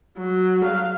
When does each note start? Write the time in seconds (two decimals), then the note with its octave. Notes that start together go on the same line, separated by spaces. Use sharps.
0.17 F#3
0.64 F5